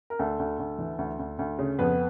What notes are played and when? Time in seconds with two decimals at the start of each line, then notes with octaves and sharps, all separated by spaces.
0.10 A#4
0.19 D2 A4
0.39 D2
0.59 D2
0.79 E3
0.98 D2
1.19 D2
1.39 D2
1.59 C#3
1.79 F2 B3 B4